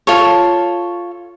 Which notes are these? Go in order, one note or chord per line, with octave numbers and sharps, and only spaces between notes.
F4 A4 C#5